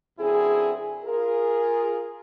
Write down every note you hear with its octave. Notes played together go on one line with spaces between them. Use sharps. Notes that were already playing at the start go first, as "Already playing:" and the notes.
F#2 D3 C4 E4 G#4
F4 G#4 A#4